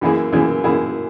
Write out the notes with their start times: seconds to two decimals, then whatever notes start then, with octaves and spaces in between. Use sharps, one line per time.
0.01 F#2 E3 A#3 E4 G#4
0.32 F#2 E3 A#3 E4 G#4
0.64 F#2 E3 A#3 E4 G#4